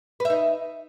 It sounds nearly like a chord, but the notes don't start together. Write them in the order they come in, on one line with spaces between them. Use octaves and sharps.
B4 E5 D#4